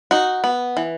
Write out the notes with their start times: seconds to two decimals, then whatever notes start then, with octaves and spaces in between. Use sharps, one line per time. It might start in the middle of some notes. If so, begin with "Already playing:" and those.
0.11 D#4 F#4
0.44 B3
0.77 E3